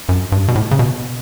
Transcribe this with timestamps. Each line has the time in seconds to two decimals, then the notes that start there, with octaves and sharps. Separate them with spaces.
0.09 F#2
0.32 G2
0.48 B2
0.55 A2
0.71 C#3
0.79 B2